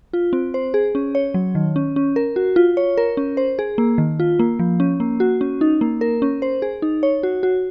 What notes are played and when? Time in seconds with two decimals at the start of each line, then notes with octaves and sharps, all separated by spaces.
0.13 F4
0.33 C4
0.54 C5
0.74 G#4
0.95 C#4
1.15 C#5
1.34 F#3
1.55 D#3
1.76 C#4
1.96 C#4
2.16 A#4
2.36 F#4
2.56 F4
2.77 C#5
2.98 A#4
3.17 C#4
3.37 C5
3.59 G#4
3.78 A#3
3.98 D#3
4.20 F4
4.39 A#3
4.59 F3
4.80 C#4
5.00 A#3
5.20 F#4
5.41 C#4
5.61 D#4
5.81 A#3
6.01 A#4
6.22 C#4
6.42 C5
6.62 G#4
6.82 D#4
7.03 C#5
7.23 F#4
7.43 F#4